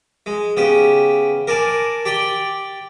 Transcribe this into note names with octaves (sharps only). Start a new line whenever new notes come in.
G#3
C#3 B3 G4
A#4 D5 G#5 A5
G4 D5 G5